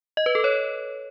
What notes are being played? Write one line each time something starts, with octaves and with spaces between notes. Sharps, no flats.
D#5
B4
A4
C#5